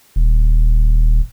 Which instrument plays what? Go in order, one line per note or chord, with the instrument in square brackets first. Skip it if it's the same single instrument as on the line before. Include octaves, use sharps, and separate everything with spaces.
[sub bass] D#1